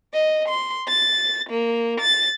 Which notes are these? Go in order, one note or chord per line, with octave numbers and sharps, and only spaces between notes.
D#5
C6
A6
A#3
A6